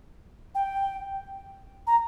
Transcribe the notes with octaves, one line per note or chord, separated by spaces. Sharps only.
G5
A#5